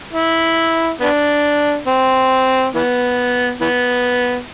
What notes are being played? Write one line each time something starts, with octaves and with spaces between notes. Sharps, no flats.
E4
B3 D4
C4
E3 B3
E3 B3